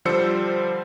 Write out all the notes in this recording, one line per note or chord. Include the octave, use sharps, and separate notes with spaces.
D3 F3 G3 C5 E6 C#7